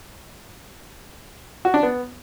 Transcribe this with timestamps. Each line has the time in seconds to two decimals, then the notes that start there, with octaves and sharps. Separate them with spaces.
1.65 F#4
1.74 D4
1.83 B3